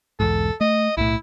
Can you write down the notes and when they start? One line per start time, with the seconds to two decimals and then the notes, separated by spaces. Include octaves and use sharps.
0.20 B1 E2 G#2 A4
0.61 A3 D#5
0.97 B1 A2 E4